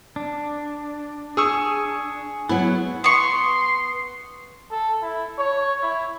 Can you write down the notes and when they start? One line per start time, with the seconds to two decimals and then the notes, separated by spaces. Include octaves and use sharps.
0.16 D4
1.37 G#4 C#6 D#6 E6
2.49 F#3 B3 E4
3.04 B3 C6 C#6
4.72 A4
5.02 E4
5.39 C#5
5.83 E4